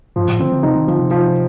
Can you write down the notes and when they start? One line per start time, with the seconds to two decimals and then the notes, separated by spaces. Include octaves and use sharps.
0.16 G2 F3
0.28 A2
0.40 D3 C4
0.52 D3
0.63 C3 D#4
0.75 D#3
0.88 D3 F3
0.99 C3
1.11 F3